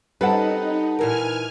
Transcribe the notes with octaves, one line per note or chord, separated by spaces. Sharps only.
G3 C4 C#4 D#4 A4 B4 F#5 A5
A#2 E3 A#4 G#5 F6